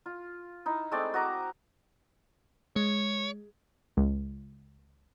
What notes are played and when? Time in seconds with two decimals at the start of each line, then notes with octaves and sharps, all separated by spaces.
0.06 F4
0.66 D#4 E4
0.92 G#3 A3 C4 D5
1.14 F#4 D#5 A#5 D6
2.76 G#3 C#5
3.97 C#2